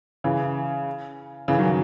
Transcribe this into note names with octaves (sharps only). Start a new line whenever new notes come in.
C#3 E3
C#3 E3
D#3 F#3